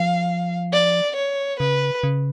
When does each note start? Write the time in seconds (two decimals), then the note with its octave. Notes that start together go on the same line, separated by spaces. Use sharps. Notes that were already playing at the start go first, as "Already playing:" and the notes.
Already playing: F3 F5
0.73 D5
1.16 C#5
1.59 C#3 B4
2.03 C#3